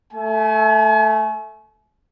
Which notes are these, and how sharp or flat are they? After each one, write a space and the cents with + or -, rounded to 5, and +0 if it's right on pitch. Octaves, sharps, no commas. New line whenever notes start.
A3 +0 G#5 +40